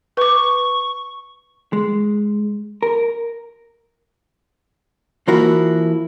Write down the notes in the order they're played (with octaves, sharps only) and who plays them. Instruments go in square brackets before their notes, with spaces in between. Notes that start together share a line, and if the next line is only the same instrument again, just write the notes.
[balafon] B4 D6 [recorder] C#6
[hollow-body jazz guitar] G#3
A#4
E3 F3 A#3 E4 F#4